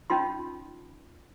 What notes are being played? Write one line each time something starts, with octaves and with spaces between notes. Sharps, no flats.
C#4 D#4 F4 C6